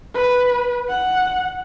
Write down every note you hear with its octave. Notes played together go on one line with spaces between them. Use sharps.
B4
F#5